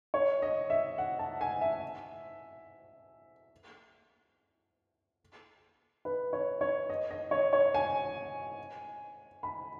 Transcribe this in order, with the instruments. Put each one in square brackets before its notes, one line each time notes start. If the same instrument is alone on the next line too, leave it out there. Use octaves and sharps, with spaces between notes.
[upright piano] C#5
D#5
E5
F#5
A5
G#5
E5
B4
C#5
C#5
D#5
D#5
C#5
C#5
G#5
B5